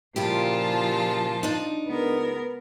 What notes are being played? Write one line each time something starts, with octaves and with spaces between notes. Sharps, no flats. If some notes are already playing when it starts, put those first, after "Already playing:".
A#2 C#3 F3 E4 F4 G4 A5
D4 D#4
C#2 B3 A#4